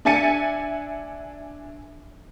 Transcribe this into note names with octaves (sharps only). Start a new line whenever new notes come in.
D4 E5 G#5 A6 C#7 D#7